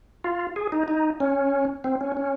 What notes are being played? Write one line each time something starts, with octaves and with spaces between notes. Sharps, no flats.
F4
G#4
D#4
D#4
C#4
C4
C#4
C#4